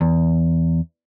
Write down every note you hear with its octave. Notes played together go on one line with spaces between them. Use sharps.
E2